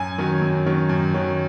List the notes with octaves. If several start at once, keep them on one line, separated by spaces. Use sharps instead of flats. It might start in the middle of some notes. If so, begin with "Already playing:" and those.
Already playing: F#2 G#5
D#3 F#3 C#4
F#2
D#3 F#3 C#4
F#2
D#3 F#3 C#4